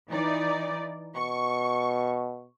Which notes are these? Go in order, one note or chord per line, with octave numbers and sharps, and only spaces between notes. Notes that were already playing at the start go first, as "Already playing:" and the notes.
E3 D#4 D5
B2 C#6